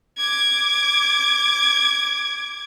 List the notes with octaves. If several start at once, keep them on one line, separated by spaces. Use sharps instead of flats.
D6 G#6